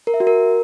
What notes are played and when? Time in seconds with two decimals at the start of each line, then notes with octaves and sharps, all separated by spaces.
0.07 A#4
0.14 E5
0.20 F#4
0.27 A#4